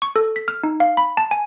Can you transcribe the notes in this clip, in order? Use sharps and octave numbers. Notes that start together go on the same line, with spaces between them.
C#6
A4
B6
F6
D#4
F5
B5
A5
G#5